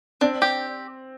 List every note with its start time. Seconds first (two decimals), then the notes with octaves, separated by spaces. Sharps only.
0.21 C4 D4
0.42 G4